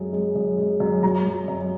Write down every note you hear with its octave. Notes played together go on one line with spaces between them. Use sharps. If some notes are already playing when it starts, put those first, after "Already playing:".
Already playing: F#2 G#3
G#3
F#2
G#3
F#2
F#3 A#5
F#3
F#2